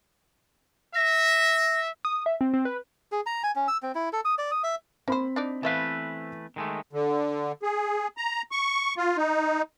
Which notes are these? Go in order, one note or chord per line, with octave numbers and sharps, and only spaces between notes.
E5 A#6
D#6
E5
C4
C4
B4
G#4
A#5
G#5
C#4
E6
C4
E4
A4
D#6
D5
D#6
E5
A#3 C4 C5 B5
D4 D#4 D5
E3 A3 B3 B4 E5 F5
D#3 G#3 A3
D3
G#4
A#5
C#6
F4
D#4